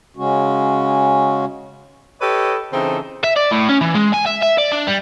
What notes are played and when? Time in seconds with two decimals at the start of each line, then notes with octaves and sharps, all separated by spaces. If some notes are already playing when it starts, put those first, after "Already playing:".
0.17 C#3 G#3 C#4 F#4
2.21 G4 A4 B4 C#5 D#5
2.72 C#3 E3 C4 D#4 A4
3.24 E5
3.36 D5
3.51 A2
3.69 C#4
3.81 E3
3.94 G#3
4.13 G#5
4.26 E5
4.42 E5
4.58 D5
4.72 D4
4.87 G3